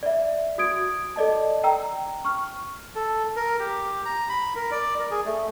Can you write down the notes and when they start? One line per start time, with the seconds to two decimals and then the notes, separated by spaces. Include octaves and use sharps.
0.03 D5 E5
0.58 F#4 D#6 G#6 D7
1.16 A4 D5 D#5 A5
1.64 G5 A#5 E6
2.25 C#6 F6
2.96 A4
3.36 A#4
3.59 G4
4.05 A#5
4.29 B5
4.56 A#4
4.71 D5
4.99 A#4
5.11 G#4
5.26 A3